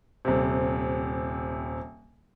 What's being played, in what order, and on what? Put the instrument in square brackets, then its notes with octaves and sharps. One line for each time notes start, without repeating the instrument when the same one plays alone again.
[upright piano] D#1 C3